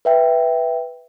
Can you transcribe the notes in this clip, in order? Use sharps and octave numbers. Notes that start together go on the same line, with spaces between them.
B4 E5 G5